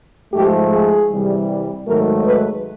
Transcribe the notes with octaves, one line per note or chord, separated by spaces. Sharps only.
G#2 F3 A3 G4
G#4
C3 E3 G3
G#2 D#3 F#3 A3 A#4
B4